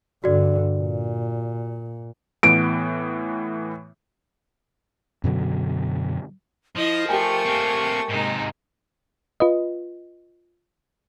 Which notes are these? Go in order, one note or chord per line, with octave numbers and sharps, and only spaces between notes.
G2 D3 F#4 D5
A#2
A2 E3 B3 D7
F#2 B2 D3 F#3
F3 E4 D#5
A3 G4 A#4 G5 G#5 C#6
A#3 C4
G#2 C3 G#3 D#4
F4 B4 D#5